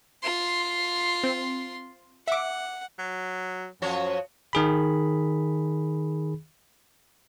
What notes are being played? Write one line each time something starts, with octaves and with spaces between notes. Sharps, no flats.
F4 C6
C4
E5 F#5 D6
F#3
F#2 F3 F#4 C#5
D#3 G#4 B5